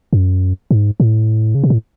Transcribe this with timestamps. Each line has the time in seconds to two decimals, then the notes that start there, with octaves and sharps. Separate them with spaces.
0.13 F#2
0.71 G#2
1.00 A2
1.55 C#3
1.64 B2
1.70 A2